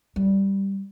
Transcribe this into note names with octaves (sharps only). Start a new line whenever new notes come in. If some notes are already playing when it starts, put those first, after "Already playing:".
G3